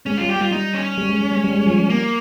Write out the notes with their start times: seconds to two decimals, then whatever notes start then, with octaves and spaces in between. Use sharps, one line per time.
0.06 G#3 C#4
0.17 G3 F4
0.29 G4
0.36 G3
0.41 F4
0.51 G3 D#4
0.74 C#4
0.98 G3
1.09 G#3
1.21 G3
1.32 G#3
1.44 G3
1.55 G#3
1.67 F3
1.78 F3
1.89 G3 A#3